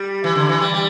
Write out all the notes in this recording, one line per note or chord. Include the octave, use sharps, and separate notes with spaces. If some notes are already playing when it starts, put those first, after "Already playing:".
Already playing: G3
E3
D3
E3
G3
G3